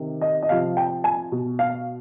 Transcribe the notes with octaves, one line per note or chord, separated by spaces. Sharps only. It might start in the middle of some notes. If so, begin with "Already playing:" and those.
Already playing: C3 D#3
D#5
D#5
C3 F3 F5
G5
G#5
B2
F5